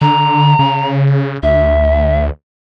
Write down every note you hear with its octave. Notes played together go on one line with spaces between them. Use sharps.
D3 A#5
C#3
D2 E5